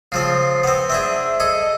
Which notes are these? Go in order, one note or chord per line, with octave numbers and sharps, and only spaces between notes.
C#3 F3 C4 C7
B3 C4
C4 D4 G#4 E5
G#4 A4 D#5
D#5